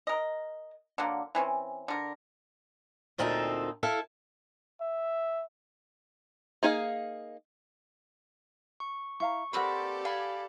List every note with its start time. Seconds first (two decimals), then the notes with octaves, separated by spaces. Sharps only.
0.07 A#4 D#5
0.98 D3 F#3 A#3
1.35 E3 C4 C#4
1.88 D3 A#4
3.18 D2 A#2 C4 D#4 A4 E5
3.83 E4 A4 E5 F5
4.81 E5
6.63 A#3 D#4 G#4 D#5 F5
8.80 C#6
9.20 E4 F5 A#5 C#6
9.53 A#3 C4 G4 A4 B4 D5 F#5 B5
10.05 F5 G#5 B5